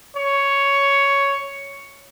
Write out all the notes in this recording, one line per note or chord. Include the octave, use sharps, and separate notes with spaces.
C#5